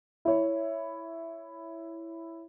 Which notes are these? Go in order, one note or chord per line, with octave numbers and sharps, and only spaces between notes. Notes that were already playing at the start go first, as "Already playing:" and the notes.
E4 C#5